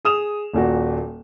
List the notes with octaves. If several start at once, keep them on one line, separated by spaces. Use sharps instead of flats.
G#4 D#6 E7 F7
D#1 A#2 F#4